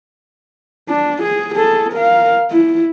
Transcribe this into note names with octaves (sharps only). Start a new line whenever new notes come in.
D4
G#4
G#4 A4
A#4 F5
E4